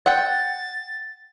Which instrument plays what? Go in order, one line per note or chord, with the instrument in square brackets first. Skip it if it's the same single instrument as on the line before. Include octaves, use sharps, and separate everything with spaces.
[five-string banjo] F#5 G5 [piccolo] A6